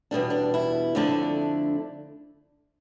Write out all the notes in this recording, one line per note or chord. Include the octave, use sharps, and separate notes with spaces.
E2 B2 G3 D4
D4
E4
F2 D3 A3 D4